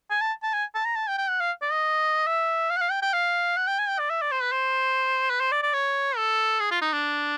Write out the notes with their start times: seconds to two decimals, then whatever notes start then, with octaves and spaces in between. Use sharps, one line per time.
0.10 G#5
0.21 A5
0.43 A5
0.53 G#5
0.75 A5
0.85 A#5
0.96 A5
1.08 G5
1.18 G5
1.28 F#5
1.40 F5
1.62 D5
1.72 D#5
2.27 E5
2.70 F5
2.77 F#5
2.81 F5
2.91 G5
3.02 G5
3.13 F5
3.57 F#5
3.67 G5
3.79 G#5
3.88 G5
3.99 D5
4.10 E5
4.22 D5
4.31 C5
4.42 B4
4.52 C5
5.30 B4
5.40 C5
5.52 D5
5.63 D5
5.73 C#5
6.17 A4
6.60 G#4
6.71 F4
6.82 D#4
6.93 D4